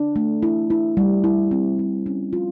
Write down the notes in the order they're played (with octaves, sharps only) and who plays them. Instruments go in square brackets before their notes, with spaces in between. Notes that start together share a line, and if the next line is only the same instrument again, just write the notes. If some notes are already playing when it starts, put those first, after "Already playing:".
Already playing: [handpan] D4
A3
E4
E4
G3
E4
C4
E4
C#4
F4